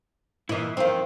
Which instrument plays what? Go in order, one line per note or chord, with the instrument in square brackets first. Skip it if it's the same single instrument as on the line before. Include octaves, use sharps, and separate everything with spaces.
[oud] A#2 E3 [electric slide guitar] E4 D#5
[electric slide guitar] F2 D#4 F5 [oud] D#3 C4